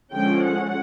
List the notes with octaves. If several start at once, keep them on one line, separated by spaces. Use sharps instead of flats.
D3 F3 G#3 C#4 G5
F#5